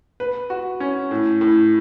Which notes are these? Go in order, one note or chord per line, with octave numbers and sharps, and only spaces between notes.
B4
F#4
C#4
A2
A2